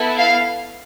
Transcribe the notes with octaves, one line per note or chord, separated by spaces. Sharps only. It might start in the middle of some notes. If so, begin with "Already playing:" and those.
Already playing: B3 E4 A4
F5